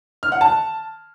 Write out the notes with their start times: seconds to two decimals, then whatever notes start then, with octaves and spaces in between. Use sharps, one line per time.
0.23 F6
0.32 F#5
0.41 A5